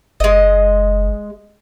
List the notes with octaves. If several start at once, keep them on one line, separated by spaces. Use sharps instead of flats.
F#1 G#3 D#5